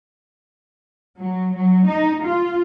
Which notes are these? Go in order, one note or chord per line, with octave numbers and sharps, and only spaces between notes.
F#3
F#3
D#4
F4